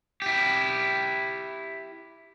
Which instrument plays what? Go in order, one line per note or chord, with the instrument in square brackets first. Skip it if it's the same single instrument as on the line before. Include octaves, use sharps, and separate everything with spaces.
[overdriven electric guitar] E4 G4